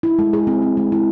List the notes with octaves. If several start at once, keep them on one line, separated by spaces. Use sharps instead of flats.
E4
G#3
G#4
C4
C4
G#3
E4